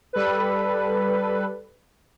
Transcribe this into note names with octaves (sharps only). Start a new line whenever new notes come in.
G3 A4 B4